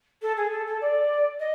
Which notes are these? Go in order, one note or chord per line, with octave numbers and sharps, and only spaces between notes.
A4
G#4
A4
A4
D5
D#5